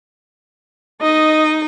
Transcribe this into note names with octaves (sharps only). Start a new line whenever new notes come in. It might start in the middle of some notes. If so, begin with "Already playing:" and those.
D#4 D#5